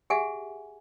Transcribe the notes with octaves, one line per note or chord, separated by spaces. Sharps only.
G4 G#4 E5 F#5 G#5